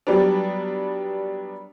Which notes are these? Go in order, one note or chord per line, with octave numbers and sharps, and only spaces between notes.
F#3 G3 B3 D4